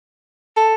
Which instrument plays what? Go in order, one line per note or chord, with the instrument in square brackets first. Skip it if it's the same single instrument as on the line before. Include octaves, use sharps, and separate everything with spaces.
[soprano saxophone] A4